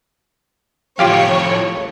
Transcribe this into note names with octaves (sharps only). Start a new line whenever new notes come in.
F2 A2 F4 G4 C#5 F5